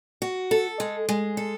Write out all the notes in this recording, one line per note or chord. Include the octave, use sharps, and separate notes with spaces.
F#4
A4
G#3
G#3
A4